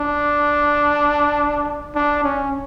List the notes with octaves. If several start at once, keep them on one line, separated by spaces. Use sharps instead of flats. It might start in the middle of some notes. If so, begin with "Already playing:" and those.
Already playing: D4
D4
C#4